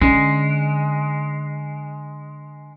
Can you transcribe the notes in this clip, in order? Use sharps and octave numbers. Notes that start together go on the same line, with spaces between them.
D3 G#3 C#4